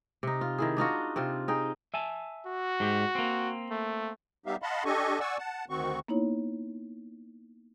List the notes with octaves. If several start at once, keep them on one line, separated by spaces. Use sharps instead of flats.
C3 D#4
F4
D#3 E4 G#4
D4 D#4 F4 F#4
C3 C4 F4
D#4 G#4 G5
E5 G#5 A5
F#4
G#2 G4
A#3 C4
A3
G3 B3 D#4 G4 E5 F5
D#5 F5 F#5 A5 B5 C6
D4 G4 A4 D#5 G#5 C#6
D5 F#5 G#5 C#6 E6
F#5 A5
D2 D#3 C4 F#4 C#6
A#3 B3 D#4 E4 C#5